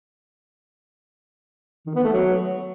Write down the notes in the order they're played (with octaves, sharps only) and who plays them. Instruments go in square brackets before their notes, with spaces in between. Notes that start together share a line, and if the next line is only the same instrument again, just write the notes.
[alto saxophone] D#3
B3
A3
F#3